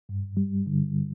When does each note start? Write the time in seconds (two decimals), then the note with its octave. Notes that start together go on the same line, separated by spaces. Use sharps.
0.09 G2
0.37 G3
0.67 D3